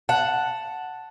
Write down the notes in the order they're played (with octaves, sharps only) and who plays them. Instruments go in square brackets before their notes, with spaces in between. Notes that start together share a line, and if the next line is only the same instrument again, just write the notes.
[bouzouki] F#5 [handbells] A5